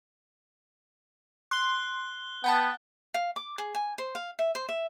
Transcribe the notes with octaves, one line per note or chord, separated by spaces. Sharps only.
C6 F#6 G7
B3 F#5 G5 A5
F5
D6
G#4
G#5
C5
F5
E5
C5
E5